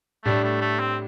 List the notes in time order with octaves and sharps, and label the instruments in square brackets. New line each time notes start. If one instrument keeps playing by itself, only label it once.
[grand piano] A2 G3 D4 [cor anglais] A3
[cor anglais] A3
A3
C4